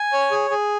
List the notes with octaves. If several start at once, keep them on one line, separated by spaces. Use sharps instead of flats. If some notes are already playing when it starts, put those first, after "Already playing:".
Already playing: G#5
C#5
G#4
G#4